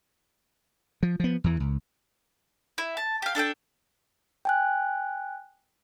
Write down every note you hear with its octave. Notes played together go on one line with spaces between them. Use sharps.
F3
F3 B3
E2 E3
C#2
E4
A5
G4 F5
D4 A4 E5 G5
G5 G#5 F#6